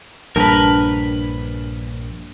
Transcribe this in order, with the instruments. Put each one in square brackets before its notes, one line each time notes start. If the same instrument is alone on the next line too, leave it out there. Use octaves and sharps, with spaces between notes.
[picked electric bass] A#1 [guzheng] G2 [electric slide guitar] A#4 B4